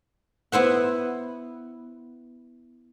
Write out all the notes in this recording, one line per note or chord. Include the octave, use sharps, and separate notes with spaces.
B3 E4 C5 F#5